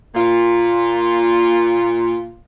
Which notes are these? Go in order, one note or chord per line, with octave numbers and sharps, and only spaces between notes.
A#2 F4